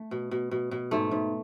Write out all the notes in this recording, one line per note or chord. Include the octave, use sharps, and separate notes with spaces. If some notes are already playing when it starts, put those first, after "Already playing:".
Already playing: A3
B2
B2
B2
B2
G#2 A3
G#2